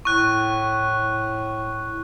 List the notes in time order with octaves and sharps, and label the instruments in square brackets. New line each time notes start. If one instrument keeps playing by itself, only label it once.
[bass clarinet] A2 [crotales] C#6 F#6